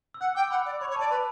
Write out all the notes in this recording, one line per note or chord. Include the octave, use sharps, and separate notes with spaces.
E6
F#5 F#6
G5 D6
F#5 B5
D5
C#5 B5
C#5
A5
D5
B4 B5